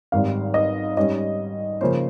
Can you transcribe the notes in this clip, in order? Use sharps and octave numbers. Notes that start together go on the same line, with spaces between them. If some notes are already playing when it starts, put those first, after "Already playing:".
G#1 G#2 G3 C4 F5
D#5
G#2 G3 C#4 D#5
C#3 F3 A#3 C#4 C5